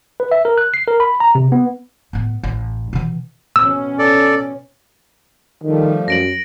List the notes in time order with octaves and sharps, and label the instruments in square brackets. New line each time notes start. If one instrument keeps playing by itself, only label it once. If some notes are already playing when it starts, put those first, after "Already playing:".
[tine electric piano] B4
E5
A#4
F#6
C7
A#4
B5
A#5
C3
B3
[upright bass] A2 B3
A1
B2 E3
[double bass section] B2 C#4 [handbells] E6
[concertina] A4 D5
[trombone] D#3 [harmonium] F3 G3 A3
[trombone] F#2 [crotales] A#6 D7 F#7